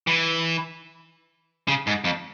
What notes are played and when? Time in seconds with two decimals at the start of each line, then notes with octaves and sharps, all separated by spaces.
0.07 E3
1.68 C#3
1.87 G#2
2.04 F2